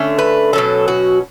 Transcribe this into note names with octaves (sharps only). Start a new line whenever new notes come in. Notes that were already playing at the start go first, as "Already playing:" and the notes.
Already playing: D3 A3 C#4
B4
B2 F#3 C#4 A4
F#4